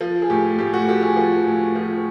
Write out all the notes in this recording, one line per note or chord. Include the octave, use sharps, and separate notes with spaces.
F3
G#4
A2 G4
A2 G4
F#4
F3 G4
G#4
F3
A2
F3